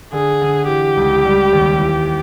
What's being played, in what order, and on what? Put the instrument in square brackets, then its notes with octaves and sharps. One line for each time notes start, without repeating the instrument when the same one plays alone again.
[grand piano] D3 [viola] G#4
[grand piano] D3
[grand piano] E3 [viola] G4
[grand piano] C#2
G3
D#2
E3